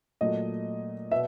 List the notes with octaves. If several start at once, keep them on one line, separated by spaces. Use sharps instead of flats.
A#2 F#3 A3 D#5
B2 E5